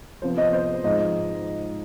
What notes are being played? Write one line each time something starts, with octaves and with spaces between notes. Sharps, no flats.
C3 F3 B3 C5
D#5
C5
G#2 F3 G#3 D#5